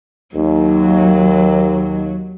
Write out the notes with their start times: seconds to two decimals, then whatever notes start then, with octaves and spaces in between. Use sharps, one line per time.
0.35 D#2 F#3